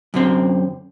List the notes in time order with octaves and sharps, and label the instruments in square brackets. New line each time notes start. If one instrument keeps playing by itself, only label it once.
[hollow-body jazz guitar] F#2 D3 C4